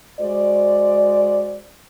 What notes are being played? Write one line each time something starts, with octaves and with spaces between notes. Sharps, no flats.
G#3 F#4 C5 D5